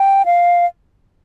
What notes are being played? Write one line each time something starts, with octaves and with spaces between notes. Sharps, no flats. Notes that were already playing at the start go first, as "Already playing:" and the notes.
Already playing: G5
F5